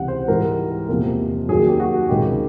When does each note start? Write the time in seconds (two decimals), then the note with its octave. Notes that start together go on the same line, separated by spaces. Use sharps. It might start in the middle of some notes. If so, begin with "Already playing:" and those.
Already playing: C#2 C3 E3 F#5
0.08 C5
0.28 G#2 E3 G3 A#4
0.88 E2 C3 F3 A#3
1.49 F#2 D#3 F#3 A#3 G#4
1.68 G4
1.80 F#4
2.09 C#2 C3 D#3 G#3 G4